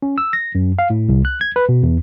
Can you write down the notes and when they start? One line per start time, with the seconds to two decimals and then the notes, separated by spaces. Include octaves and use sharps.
0.02 C#4
0.18 E6
0.33 A#6
0.55 F#2
0.79 F5
0.90 A2
1.09 C2
1.25 F#6
1.41 G#6
1.56 B4
1.69 B2
1.83 E2